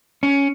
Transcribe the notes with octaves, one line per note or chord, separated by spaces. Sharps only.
C#4